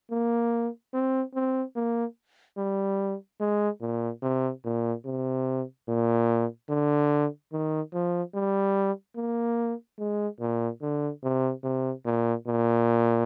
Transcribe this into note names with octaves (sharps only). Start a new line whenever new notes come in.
A#3
C4
C4
A#3
G3
G#3
A#2
C3
A#2
C3
A#2
D3
D#3
F3
G3
A#3
G#3
A#2
D3
C3
C3
A#2
A#2